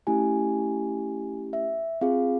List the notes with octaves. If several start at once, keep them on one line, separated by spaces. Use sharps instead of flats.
A3 C#4 E4 G4 G#5
E5
C4 F4 G#4 F5